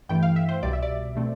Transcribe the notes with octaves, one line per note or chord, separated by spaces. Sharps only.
G2 E3 A3 G5
F5
E5
C5
C2 B2 G3 D5
E5
D5
B2 A3 C4